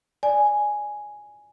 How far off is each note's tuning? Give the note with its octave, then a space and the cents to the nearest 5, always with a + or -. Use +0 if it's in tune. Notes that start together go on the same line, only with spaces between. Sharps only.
D5 +0 G#5 +0